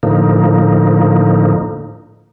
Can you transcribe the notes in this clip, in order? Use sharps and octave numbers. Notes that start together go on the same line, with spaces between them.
A2 D3 F3 A#3 D#4